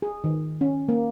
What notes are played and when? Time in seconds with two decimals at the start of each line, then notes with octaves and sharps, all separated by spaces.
0.02 G#4
0.24 D#3
0.61 C#4
0.89 A#3